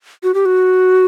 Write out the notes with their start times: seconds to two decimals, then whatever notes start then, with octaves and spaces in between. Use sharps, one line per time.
0.23 F#4
0.34 G4
0.45 F#4